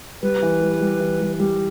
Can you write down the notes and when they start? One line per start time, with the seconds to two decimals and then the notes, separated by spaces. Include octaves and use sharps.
0.23 G3 B4
0.42 E3
0.62 G3
0.81 G3
1.01 E3
1.21 G3
1.40 G3